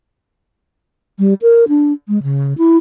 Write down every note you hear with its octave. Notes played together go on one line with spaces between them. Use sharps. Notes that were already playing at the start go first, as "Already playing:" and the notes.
G3
A#4
D4
G#3
C#3
E4